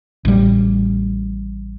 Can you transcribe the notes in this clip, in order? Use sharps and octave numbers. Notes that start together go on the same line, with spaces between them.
A1 G3